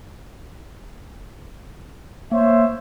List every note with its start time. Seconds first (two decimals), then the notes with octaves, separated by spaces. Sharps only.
2.32 A#3 C5 C#5 E5